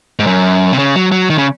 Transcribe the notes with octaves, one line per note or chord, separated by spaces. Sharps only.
G#2
F#2
C3
C#3
F#3
F#3
D#3
C#3